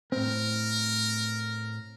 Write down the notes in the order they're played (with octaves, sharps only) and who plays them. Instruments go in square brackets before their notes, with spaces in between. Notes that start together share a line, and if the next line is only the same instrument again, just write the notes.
[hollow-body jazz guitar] A2 C4 [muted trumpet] A#4